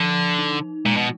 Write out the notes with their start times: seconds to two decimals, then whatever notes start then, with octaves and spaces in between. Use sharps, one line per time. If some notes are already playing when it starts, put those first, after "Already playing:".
Already playing: D3 F3
0.39 D#4
0.85 A#2 G#3
0.97 B2